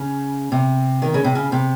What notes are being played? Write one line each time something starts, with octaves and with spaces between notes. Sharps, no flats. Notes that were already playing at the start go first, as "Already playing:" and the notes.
Already playing: C#3
C3
D#3
C#3
C3
C#3
C3